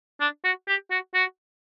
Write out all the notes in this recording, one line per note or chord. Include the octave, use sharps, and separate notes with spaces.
D4
F#4
G4
F#4
F#4